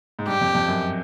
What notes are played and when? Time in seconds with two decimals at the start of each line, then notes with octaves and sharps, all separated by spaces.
0.19 G#2
0.28 G2 G4
0.41 F2
0.54 F2
0.68 F#2